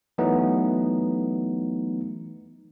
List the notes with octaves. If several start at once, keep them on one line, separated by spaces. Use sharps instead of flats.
E3 F#3 A3 B3 D#4